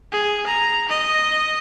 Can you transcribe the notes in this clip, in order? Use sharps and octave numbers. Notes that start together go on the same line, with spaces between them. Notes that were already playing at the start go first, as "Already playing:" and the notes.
G#4
A#5
D#5